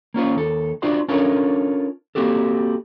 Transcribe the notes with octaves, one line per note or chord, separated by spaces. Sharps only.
A#3 C#4 F4 C5
D#2 A4
D4 F4 F#4 C5 D5 C6
C#4 D4 F4 A4 A#4 C#5
A#3 C4 F#4 G4 A4